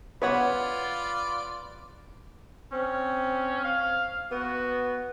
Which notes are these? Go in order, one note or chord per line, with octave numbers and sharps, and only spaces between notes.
B3 F4 B4 C#5 D5 F#5
C4 C#4
F5
B3 F#4